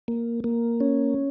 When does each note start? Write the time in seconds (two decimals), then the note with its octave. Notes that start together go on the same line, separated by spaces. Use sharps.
0.08 A#3
0.44 A#3
0.81 C#4